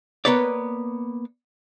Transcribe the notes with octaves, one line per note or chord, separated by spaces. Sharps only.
A#3 B3 B4 C#5 D5